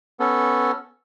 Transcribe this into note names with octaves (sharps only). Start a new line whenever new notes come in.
B3 C#4 A4